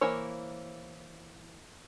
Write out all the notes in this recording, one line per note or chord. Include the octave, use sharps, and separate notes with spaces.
E3 A#3 E4 C5 C#5